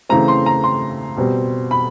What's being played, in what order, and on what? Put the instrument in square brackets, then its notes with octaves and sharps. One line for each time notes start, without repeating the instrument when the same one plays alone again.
[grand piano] C#3 E3 A3 C4 A#5
C6
A#5
C6
B2 G3 C4
B5